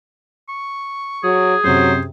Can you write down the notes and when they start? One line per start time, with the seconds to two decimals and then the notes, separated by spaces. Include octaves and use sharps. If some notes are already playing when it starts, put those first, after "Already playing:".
0.49 C#6
1.24 F#3 G#4
1.64 F#2 C3 F#3 C5